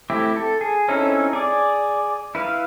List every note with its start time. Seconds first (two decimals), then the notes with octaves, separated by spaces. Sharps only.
0.10 A3 C4 E4 G4
0.36 A4
0.61 G#4
0.88 C4 C#4 D#4 E4 A4
1.33 G#4 D5
2.35 E4 B4 F5